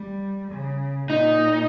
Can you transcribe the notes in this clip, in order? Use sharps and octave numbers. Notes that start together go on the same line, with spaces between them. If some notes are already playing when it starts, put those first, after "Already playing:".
Already playing: G3
C#3
A#2 D#4